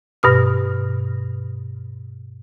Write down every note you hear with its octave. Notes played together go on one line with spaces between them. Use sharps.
G2 B2 F6